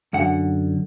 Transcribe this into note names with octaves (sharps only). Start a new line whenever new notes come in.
F#2 D3 F#5